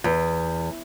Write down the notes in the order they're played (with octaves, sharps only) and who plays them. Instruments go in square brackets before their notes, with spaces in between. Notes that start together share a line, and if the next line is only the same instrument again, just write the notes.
[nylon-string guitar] E2